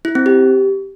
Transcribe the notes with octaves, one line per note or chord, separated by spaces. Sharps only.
E4
C4
G4